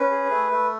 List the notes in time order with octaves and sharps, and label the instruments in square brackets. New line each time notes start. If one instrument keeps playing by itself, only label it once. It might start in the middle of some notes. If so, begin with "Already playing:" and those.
Already playing: [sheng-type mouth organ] C#4 B4
G#4
A3
A3